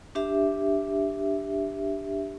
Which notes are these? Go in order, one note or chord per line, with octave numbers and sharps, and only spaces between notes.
D4 G4 E5